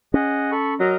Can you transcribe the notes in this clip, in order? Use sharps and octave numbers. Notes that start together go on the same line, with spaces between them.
C#4 G#4 D#5 F#5
A4 B5 C#6
F#3 A#4 D#5 A#5